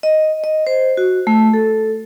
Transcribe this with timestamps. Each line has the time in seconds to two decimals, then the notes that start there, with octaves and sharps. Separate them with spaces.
0.03 D#5
0.44 D#5
0.67 C5
0.97 F#4
1.27 A3
1.54 A4